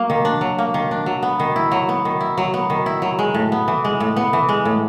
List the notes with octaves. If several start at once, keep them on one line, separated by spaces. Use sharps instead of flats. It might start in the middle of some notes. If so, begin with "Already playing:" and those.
Already playing: F#3 A#3
D#3
D4
F#3
A#3
D#3
D4
F#3
B3
D#3
E4
F#3
B3
D#3
E4
F#3
B3
D#3
E4
F#3
G#3
A2
B3
E3
G#3
A2
B3
E3
G#3
A2